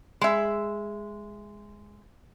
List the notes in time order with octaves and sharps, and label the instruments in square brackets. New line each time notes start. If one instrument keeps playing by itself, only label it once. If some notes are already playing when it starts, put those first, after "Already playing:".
[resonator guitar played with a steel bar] G#3 E5